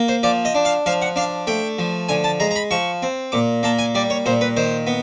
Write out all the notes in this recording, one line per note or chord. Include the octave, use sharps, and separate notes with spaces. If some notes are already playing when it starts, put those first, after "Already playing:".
Already playing: A#3
C5
F3 D5
D#5
D4
F5
F3 F5
F#5
D4 F5
A3 G5
F3
D3 G#5
A5
G#3 A#5
A#5
B5
F3 C#6
C4
A#2 D6
A#3 A5
G#5
G3 D5
C#5
A#2 C5
B4
D#3 C5
B3